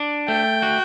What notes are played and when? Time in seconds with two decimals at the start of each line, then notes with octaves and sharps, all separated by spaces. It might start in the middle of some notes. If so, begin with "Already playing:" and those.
Already playing: D4
0.28 A3 G5
0.62 F#4